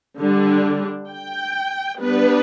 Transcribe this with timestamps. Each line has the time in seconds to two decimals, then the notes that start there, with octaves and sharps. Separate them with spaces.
0.19 D3 G3 D4
1.10 G5
2.00 G3 B3 D4 B4